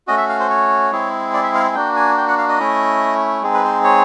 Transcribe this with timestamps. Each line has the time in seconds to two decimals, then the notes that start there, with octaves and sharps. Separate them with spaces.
0.07 A3 C#4 F#4 D#5
0.18 E5
0.29 F5
0.40 C5
0.50 C#5
0.92 G#3 C4 E4 G#4
1.34 D5
1.43 E5
1.55 F5
1.75 A#3 D4 F#4 G5
1.96 G#5
2.18 G5
2.28 F#5
2.38 F5
2.48 D#5
2.59 A3 C#4 E4
3.42 G#3 C4 D#4 G#4
3.54 B4
3.64 C5
3.84 C#5